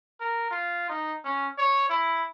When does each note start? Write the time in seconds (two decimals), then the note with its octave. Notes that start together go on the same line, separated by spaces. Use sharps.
0.20 A#4
0.51 F4
0.89 D#4
1.25 C#4
1.58 C#5
1.90 E4